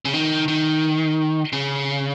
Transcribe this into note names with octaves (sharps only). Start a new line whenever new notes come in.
C#3
D#3
D#3
C#3